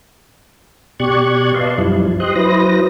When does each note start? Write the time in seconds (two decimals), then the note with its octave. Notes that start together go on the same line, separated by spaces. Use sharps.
1.00 B2 G4 D5 C#6 F#6 G#6
1.54 B4 D5 D#5 F5 A5 C6
1.78 F#2 F3 G3 E4
2.20 G4 C5 D#5 C6 D#6 F#6
2.36 F#3 E4 B4 C5 D#6 A#6